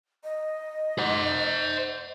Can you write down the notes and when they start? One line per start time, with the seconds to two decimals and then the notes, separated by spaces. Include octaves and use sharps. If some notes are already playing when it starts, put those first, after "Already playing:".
0.24 D#5
0.98 C5 F#5